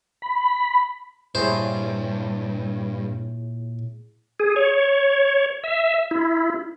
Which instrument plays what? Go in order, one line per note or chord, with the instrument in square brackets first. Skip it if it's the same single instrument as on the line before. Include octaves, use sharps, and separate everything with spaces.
[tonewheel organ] B5
[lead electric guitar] G2 [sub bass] A#2 [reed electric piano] E4 G#4 C#5 [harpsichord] C5
[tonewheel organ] G#4
C#5
E5
E4